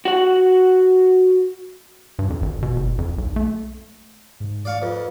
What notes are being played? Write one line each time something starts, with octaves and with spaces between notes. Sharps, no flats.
F#4 F#5
G2
F2
G#1
B2
F#1
F2
B1
A3
G#2
D5 F5 C#6
F2 B4